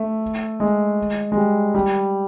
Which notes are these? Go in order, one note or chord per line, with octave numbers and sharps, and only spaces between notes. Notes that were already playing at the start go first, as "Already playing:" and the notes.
Already playing: A3
G#3
G#3
G3
G3